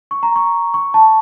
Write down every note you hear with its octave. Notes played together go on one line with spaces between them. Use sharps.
C#6
A#5
C#6
C#6
A5